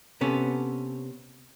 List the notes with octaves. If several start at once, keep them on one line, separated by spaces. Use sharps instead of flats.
C3 B3 C#4 A4